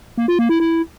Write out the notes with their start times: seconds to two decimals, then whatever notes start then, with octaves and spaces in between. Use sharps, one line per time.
0.18 A#3
0.28 F4
0.39 A#3
0.49 E4
0.60 E4